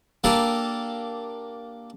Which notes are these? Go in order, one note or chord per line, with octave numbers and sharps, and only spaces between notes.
A#3 D4 G4 A4 A#4